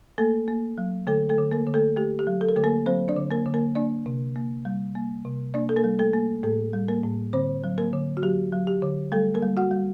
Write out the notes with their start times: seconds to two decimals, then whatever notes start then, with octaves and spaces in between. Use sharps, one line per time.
0.18 A3 A#3 A4
0.48 A#3
0.78 F#3
1.07 D3 A3 A4
1.29 A3 A4
1.38 D3
1.52 A#3 A#4
1.67 D3
1.74 A3 A4
1.96 A3 G4
2.19 G4
2.27 F#3
2.41 A4
2.49 A#4
2.56 D3 A3 A4
2.64 A#3 A#4
2.86 F#3 C4 C5
3.08 D4 D5
3.17 D3
3.30 A#3 A#4
3.46 D3
3.54 A#3 A#4
3.75 A#3 D4 D5
4.06 C3
4.36 A#3
4.65 G3
4.95 A#3
5.25 C3
5.54 A#3 D4 D5
5.69 A4
5.77 A#3 A#4
5.84 G3
5.99 A3 A4
6.13 A#3
6.43 A2 A3 A4
6.73 G3
6.88 A#3 A#4
7.03 A2
7.33 D3 C4 C5
7.64 F#3
7.78 A#3 A#4
7.93 D3
8.17 F#4
8.23 F#3 G4
8.52 F#3
8.67 G4
8.82 D3
9.12 G3 A3 A4
9.34 A#3 A#4
9.42 G3
9.57 F#4 F#5
9.71 G3